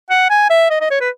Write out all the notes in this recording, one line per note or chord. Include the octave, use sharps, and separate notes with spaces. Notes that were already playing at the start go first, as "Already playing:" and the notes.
F#5
G#5
E5
D#5
D#5
C#5
B4